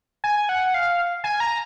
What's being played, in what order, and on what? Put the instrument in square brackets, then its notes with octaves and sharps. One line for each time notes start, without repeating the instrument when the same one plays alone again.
[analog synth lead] G#5
F#5
F5
G#5
A#5